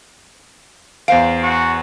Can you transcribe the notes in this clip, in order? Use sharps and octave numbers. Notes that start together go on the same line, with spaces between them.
E2 C5 F5 D7
F#4